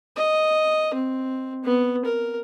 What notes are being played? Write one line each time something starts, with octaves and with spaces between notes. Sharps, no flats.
D#5
C4
B3
A#4